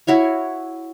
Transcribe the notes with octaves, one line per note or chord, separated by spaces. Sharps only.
E4 F#4 C#5 F5